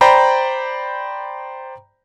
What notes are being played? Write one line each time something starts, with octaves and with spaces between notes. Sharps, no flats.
C5 D5 G5 A#5 B5